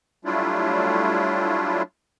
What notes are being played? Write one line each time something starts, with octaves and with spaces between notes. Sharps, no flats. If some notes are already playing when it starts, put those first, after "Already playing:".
F#3 G3 A3 D4 E4 F4